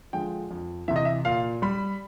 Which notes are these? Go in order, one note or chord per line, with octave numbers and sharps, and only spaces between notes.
D3 F3 G#3 G5
F2
C3 E3 E5
D#5
E5
A#2 F5
G3 B5